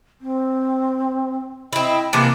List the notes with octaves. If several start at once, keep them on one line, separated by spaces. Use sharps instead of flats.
C4
C4 E4 D#5
C3 E3 F3 A#3